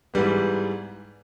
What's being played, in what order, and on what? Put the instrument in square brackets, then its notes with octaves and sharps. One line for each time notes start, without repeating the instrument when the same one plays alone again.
[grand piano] G#2 E3 G3 B3